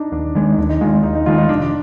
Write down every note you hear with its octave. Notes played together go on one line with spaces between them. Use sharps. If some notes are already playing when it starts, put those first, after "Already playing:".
Already playing: D4 D#4
D#2 D4
D#3 G#3
D#4
D#2 D4
D#4
D#3 G#3 F4
D#4
D#2 D#4
D#4
D#3 G#3 F4
D#4
F1 D4